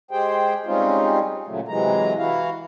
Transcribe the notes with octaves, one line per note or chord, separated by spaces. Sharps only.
G#3 G4 G#4 C5 G5
G3 G#3 C4 C#4 D#4 F4
A#2 C#3 F#3 A3
C3 E3 F#3 G#3 A#5
E3 E4 F#4 F5